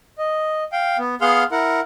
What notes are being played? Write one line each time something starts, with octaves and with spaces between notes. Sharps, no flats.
D#5
F5 G5
B3
B3 G#4 F5 F#5 C6 F6
E4 A#4 F#5